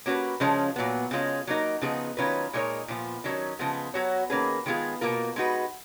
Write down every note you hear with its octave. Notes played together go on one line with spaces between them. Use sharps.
A#3 C#4 F#4 B4
C#3 F3 G#3 C#4 F4
A#2 F#3 B3
C#3 G#3 C#4 F4
F#3 A#3 D#4 A#4
C#3 F3 B3 D#4 G#4
D#3 F#3 C#4 F4 B4
A#2 G#3 D#4 A#4 C#5
A#2 F3 B3
D#3 F#3 C#4
C#3 F3 G#3 B3
F#3 B3 F#4 C#5
D#3 A#3 C#4 G#4 B4
D#3 G#3 B3 F4 G#4
B2 A#3 F4 A#4
G#3 D#4 F#4 B4